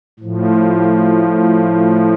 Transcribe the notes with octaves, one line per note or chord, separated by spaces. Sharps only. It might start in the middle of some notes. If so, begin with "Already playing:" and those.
A2 F3
F4
G4